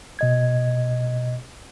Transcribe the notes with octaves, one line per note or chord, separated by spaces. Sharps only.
B2 D#5 G#6